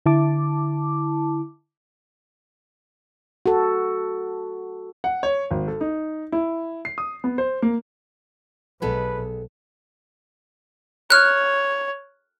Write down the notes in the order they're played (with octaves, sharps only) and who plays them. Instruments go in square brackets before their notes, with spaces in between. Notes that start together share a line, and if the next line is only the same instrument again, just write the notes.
[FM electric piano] D3 E4 A5 D6
[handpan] F#4 A4
[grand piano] F#5
C#5
G#1
A4
D#4
E4
C7
D#6
B3
C5
A#3
[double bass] B1 [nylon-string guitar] G#3 B3 A4 [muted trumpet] B4
[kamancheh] C#5 [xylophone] F6 F#6